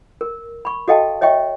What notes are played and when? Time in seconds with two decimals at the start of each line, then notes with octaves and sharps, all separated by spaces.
0.21 A#4
0.65 B5 C#6
0.88 F#4 A4 D#5 F5 G5 A5
1.21 C#5 D#5 E5 G5 C#6